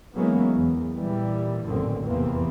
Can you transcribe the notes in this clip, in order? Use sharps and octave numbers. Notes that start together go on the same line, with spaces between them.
E3 F#3 G#3 A#3 B3 C#4
E2
A#2 E3 G3
A1 F#2 A#2 D3 D#3 C4
F1 E2 C3 E3 A#3 C4